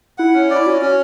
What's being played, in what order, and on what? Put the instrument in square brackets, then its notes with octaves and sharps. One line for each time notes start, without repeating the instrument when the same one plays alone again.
[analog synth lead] E4 [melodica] F#5
[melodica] C#4
D5
[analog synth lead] E4
[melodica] C#4 [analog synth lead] F#4
[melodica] C#4